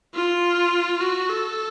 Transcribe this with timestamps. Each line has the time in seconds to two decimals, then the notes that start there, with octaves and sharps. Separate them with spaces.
0.15 F4
1.00 F#4
1.30 A4